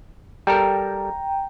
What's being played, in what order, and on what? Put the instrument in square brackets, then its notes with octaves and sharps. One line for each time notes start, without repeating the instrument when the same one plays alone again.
[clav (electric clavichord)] G3 A4 A#4 [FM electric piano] G5 A#5